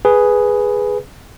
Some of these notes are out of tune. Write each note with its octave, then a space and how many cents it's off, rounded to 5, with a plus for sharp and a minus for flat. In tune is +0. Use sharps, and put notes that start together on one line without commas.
G#4 +0 B4 +0